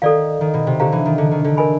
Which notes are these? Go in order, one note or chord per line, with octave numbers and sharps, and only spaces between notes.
D#3 A4 D5 F5
D#3
B2
C3
D3 G4 C5 F5 A#5
E3
D#3
D3
D#3
D3
A#4 D#5 G#5 B5